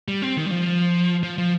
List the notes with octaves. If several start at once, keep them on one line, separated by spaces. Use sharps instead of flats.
G3
C4
D#3
G3
F3
F3
F3